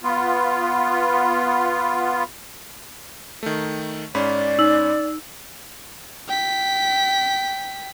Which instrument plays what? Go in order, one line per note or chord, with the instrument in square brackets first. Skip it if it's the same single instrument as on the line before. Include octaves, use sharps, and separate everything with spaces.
[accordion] B3 F4
[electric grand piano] D#3 A3
[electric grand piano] G#2 C#4 B5 [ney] D5
[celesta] D#4 E6 F#7
[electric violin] G5 B6